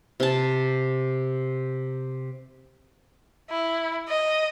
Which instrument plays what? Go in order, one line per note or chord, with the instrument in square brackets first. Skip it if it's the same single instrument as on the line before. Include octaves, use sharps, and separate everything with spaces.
[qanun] C3 A5
[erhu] E4
D#5